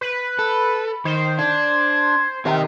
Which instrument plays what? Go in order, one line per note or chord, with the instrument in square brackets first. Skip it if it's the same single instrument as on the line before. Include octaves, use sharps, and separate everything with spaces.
[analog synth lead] B4
[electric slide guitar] A4 [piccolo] B5
[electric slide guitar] D#3 [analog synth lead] C5
[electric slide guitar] D4 [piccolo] G#6
[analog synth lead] D#3 [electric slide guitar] C4 G4